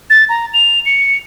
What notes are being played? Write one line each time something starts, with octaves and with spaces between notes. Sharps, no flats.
A6
A#5
F7
C#7